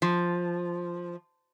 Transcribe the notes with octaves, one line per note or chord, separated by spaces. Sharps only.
F3